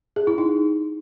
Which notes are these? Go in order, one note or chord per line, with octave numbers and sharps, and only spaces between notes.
G#4
E4
D#4